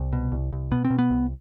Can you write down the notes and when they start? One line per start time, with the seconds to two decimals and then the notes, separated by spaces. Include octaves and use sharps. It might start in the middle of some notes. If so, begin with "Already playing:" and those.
Already playing: C2
0.13 B2
0.32 C2
0.53 C2
0.71 B2 B3
0.85 C4
0.90 B2
0.99 B3
1.10 C2